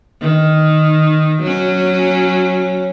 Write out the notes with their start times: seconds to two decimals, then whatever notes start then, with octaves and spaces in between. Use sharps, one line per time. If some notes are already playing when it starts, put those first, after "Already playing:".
0.22 D#3
1.43 F#3 C#4